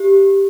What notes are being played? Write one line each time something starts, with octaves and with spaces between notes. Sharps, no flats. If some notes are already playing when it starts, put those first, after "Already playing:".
Already playing: G4